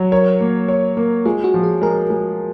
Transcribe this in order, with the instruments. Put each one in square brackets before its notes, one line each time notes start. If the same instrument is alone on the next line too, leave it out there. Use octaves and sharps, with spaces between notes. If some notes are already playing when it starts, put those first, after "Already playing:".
Already playing: [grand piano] F#3
[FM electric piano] A#4 [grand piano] C#5
[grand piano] A#3
C#5
A#3
[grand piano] G#3 [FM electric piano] F4
[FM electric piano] F#4
[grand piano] F3
[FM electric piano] G#4
[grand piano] G#3 [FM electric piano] A#4
[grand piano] G#3